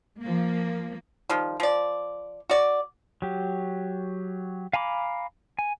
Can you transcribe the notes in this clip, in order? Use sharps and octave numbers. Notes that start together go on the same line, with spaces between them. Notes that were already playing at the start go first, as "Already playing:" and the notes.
F3 A#3
D#3 F3 G3
F3 D5
F#4 D5
F#3 G4
F5 G#5 A#5 B5 D6
G#5